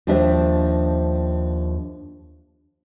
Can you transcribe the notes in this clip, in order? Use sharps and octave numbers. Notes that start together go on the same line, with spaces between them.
D#2 F3 D4 C5 E5